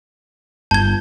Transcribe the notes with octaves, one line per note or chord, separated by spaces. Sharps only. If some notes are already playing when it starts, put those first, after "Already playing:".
G1 A5 G6 G#6